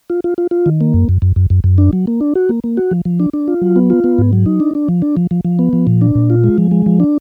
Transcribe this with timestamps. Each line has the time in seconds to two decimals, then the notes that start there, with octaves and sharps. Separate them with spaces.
0.10 F4
0.24 F4
0.38 F4
0.51 F4
0.66 D#3
0.81 A#3
0.94 F#2
1.09 F#2
1.22 F#2
1.36 F#2
1.50 F#2
1.64 F#2
1.78 D4
1.93 F#3
2.07 A#3
2.21 D4
2.35 F#4
2.49 A#3
2.64 A#3
2.77 F#4
2.91 F3
3.05 F3
3.20 D4
3.33 D4
3.48 F4
3.61 F#3
3.76 B3
3.90 F4
4.04 B3
4.18 G#2
4.33 F#3
4.46 D#4
4.60 D4
4.75 D4
4.88 F3
5.02 D4
5.17 F3
5.31 F3
5.45 F3
5.59 B3
5.73 F3
5.87 A#2
6.01 D4
6.15 A#2
6.30 F4
6.44 G#3
6.58 F3
6.71 G#3
6.86 F3
7.00 D4